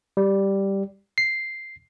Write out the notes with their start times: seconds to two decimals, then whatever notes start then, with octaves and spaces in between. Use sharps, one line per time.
0.17 G3
1.18 C7